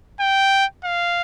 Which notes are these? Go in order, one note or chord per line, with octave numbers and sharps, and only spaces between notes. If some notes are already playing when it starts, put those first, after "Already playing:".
G5
F5